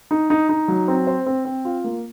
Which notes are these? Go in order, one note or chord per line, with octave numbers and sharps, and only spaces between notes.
D#4
D#4
D#4
F#3
C4
C5
C4
C4
F4
A#3